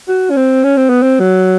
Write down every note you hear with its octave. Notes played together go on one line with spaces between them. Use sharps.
F#4
C#4
C4
C#4
C4
B3
C4
F#3